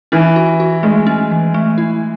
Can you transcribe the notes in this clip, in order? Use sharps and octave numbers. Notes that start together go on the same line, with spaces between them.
E3 C#4
F#4
F#4
G#3 A3
C#4
E3
A3
E4